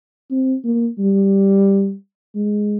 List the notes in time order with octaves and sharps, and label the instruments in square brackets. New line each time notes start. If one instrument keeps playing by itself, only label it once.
[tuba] C4
A#3
G3
G#3